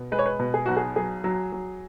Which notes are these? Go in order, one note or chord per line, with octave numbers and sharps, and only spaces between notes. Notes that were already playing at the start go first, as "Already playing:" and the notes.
Already playing: B2
G#3 B4
C#5
B4
B2
G#4
B1 F#4
G#4
F#3 G#4
F#3
F#3